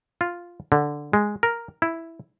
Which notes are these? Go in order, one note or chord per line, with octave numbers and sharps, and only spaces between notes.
F4
D3
G#3
A#4
E4